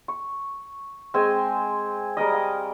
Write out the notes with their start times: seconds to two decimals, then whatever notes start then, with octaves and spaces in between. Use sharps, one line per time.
0.08 C#6
1.14 G#3 C4 G#4 G#5
2.17 G3 G#4 A#4 D#5
2.32 F5 D#6